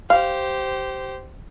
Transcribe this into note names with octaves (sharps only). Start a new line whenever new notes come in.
G4 C5 F5